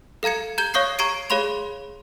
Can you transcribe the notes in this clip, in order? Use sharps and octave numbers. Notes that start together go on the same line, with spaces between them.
A4 F5 A#5 G#6 C#7
A#5 G6 G#6 G7
C#5 F5 C#6 D#6 G6 C7
A#5 C#6 G#6 C7 D7 D#7
G#4 C#5 F5 B5 C6 F7